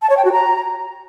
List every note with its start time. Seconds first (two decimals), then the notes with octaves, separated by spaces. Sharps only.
0.02 A5
0.10 C#5
0.17 G5
0.25 F#4
0.32 A#5